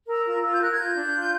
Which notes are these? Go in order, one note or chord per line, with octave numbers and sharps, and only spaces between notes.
A#4 E6
F4 E6
F4 E6
G6
A#4 F#6
G#6
F4 G6
D4
F4